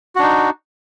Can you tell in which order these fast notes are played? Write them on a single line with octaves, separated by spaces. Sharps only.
F#4 D4 D#4